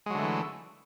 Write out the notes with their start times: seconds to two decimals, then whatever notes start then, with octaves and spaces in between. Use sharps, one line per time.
0.06 G#3
0.10 F#3
0.14 D3
0.19 A3
0.23 E3